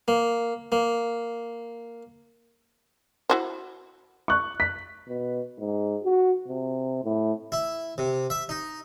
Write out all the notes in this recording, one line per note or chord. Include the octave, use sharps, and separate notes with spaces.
A#3
A#3
E4 F#4 C5
C#6 F#6
B6
B2
G#2
F#4
C3
A2
E4
C3
E5
D#4